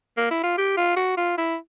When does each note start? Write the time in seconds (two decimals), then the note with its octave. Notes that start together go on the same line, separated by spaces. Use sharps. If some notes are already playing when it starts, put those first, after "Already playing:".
0.17 A#3
0.31 E4
0.44 F4
0.57 G4
0.77 F4
0.96 F#4
1.17 F4
1.38 E4